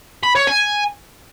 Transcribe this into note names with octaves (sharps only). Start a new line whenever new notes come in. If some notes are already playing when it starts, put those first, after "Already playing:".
B5
C#5
G#5